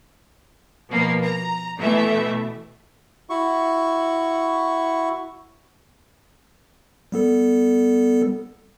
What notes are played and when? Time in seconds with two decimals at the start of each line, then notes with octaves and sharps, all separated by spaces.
0.89 B2 F3 A#3
1.23 A#5
1.79 B2 E3 A3 E5
3.30 E4 F#4 C#6
7.12 G3 B3 A4